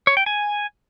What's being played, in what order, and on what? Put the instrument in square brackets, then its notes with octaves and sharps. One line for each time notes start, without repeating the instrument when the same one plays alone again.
[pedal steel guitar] C#5
G5
G#5